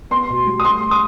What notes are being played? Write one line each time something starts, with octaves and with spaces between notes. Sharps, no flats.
B3 C6
B2
G3
D#6
A3 C6
D#6